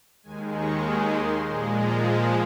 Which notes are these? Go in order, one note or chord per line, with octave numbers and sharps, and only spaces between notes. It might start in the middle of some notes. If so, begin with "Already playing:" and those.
D#2 D#3 G#3 G#5
C#6
C6
A#2 F3 G#3
A#5